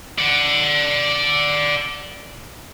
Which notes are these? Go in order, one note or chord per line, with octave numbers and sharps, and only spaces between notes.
D5 F#5